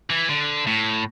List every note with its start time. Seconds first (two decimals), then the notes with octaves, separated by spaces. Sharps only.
0.10 E3
0.29 D3
0.67 A2